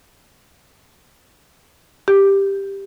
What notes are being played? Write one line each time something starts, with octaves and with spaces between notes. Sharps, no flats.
G4